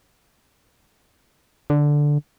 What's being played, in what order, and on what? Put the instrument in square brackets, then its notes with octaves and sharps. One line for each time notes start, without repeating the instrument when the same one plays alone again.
[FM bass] D3